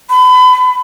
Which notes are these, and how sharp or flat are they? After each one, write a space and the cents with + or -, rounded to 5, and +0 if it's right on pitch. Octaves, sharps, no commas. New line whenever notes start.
B5 +35